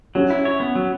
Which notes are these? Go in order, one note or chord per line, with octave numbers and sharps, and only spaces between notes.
F#3 C#4
E4
C#5
B3
F#3